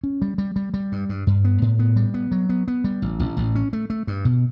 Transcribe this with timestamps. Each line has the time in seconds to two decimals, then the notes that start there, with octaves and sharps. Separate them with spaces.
0.04 C#4
0.22 G3
0.38 G3
0.56 G3
0.74 G3
0.92 G2
1.09 G2
1.27 G2
1.44 B3
1.62 A2
1.79 B3
1.96 G3
2.14 B3
2.32 F#3
2.49 B3
2.68 B3
2.84 G3
3.02 A1
3.19 A1
3.37 A1
3.55 C#4
3.73 A3
3.90 A3
4.07 G2
4.25 B2